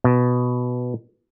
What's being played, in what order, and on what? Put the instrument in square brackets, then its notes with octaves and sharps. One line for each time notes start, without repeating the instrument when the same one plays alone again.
[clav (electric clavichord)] B2